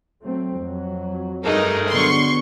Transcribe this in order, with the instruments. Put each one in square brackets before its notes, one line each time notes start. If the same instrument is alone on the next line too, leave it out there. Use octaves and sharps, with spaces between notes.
[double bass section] F#3 A3 C4
F2 F#3
[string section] G2 D#4 [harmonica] G#3 A3 A#4
[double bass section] D3 F#3 B3 [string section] C6 C#6